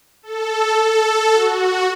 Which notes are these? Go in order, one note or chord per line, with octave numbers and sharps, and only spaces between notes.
A4
A4
F#4